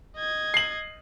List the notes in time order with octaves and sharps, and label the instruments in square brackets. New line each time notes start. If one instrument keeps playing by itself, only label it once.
[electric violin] D#5 G#6
[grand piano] C7 F#7